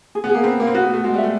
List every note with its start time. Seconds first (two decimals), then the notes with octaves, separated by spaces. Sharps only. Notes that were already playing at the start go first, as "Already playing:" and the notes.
0.15 G#4
0.24 B3
0.29 G#4
0.35 A#3
0.44 C4 B4
0.58 A#3 B4
0.67 C4
0.74 B3 F#4
0.83 A3
0.88 F#4
0.94 A3
1.04 G#3 F#4
1.14 G3 E5
1.24 A3